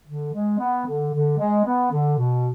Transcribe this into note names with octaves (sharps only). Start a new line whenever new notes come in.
D3
G#3
B3
D3
D3
G#3
B3
D3
B2